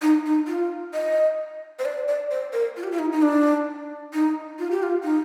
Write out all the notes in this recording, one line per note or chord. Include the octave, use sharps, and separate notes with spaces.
D#4
D#4
F4
D#5
C5
D5
D5
C5
A#4
F4
G4
F4
D#4
D#4
D4
D#4
F4
G4
F4
D#4